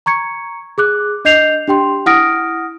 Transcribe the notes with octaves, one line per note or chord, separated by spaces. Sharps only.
A#5 C#6 G#6 C#7
G#4 D6 F#6
D4 D#5 G6 C7 F7
D4 G4 G5 C6
E4 F#5 D#6 F6 A#6 D7